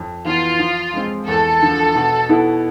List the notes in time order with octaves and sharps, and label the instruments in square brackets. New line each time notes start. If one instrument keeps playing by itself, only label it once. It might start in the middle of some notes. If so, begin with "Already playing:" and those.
Already playing: [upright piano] F2
[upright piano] E3 B3 [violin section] F4
[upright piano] F3
G#3 C4
[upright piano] E2 [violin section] A4
[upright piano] D3 F3
B2
B3 E4 A4